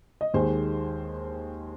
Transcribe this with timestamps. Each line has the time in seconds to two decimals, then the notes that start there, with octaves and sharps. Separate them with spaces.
0.21 D#5
0.34 D#2 D#3 G#3 G#4 C5